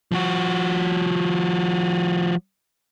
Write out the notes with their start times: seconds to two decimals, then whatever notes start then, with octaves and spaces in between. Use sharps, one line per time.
0.12 F3 F#4